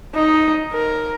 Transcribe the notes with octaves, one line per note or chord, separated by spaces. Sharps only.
D#4
A#4